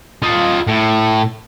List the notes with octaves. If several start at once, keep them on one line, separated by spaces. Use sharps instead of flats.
F4 D#5
A2